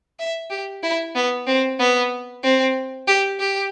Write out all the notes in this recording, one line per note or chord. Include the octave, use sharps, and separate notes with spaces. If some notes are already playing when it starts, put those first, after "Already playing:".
E5
G4
E4
B3
C4
B3
C4
G4
G4